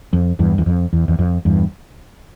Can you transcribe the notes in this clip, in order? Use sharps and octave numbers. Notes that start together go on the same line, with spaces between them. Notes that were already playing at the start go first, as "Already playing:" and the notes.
F2
E2 G2
E2
F2
E2
E2
F2
E2 G2